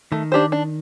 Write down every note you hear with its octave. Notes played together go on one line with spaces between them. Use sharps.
D#3 A3
D4 G4 C5
D4